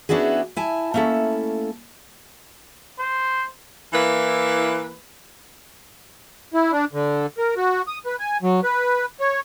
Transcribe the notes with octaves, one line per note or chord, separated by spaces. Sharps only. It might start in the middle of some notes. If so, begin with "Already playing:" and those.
B3 C#4 D4 E4 F#4 G#4
E4 G#5 A5
A3 A#3 C#4 E4 A4
C5
E3 A#3 E4 B4
E4
D4
D3
A#4
F#4
D#6
B4
G#5
F#3
B4
C#5